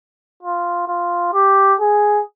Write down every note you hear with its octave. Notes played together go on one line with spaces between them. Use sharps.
F4
F4
G4
G#4